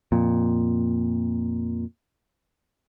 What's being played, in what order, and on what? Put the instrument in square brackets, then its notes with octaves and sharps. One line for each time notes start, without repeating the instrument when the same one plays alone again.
[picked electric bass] F2 A#2